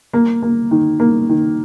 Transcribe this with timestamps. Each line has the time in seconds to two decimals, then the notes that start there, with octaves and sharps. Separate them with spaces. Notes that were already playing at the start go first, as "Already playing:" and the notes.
0.14 A#3
0.42 A#3
0.71 D#3
1.00 A#3
1.29 D#3